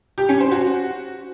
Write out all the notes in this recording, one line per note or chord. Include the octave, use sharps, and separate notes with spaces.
G4
C#4
C5
F#4